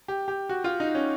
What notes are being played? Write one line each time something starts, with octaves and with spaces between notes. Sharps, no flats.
G4
G4
F#4
F4
D#4
C#4